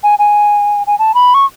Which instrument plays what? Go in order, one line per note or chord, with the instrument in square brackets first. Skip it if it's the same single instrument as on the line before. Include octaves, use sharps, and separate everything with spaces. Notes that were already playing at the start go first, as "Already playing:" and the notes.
[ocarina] G#5
G#5
G#5
A5
B5
C#6